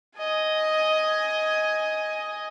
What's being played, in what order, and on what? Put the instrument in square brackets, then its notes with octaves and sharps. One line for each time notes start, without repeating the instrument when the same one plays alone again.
[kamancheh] D#5 G#5